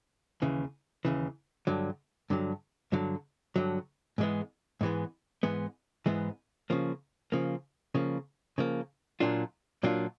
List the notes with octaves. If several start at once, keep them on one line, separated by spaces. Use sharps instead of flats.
D#2 C#3 E3
D#2 C#3 E3
G2 D3 F#3
G2 D3 F#3
G2 D3 F#3
G2 D3 F#3
G#2 E3 G#3 B3
G#2 E3 G#3 B3
G#2 E3 G#3 B3
G#2 E3 G#3 B3
C#3 F3 A#3
C#3 F3 A#3
C#3 F3 A#3
C#3 F3 A#3
A#2 F#3 A#3 D4 F4
A#2 F#3 A#3 D4 F4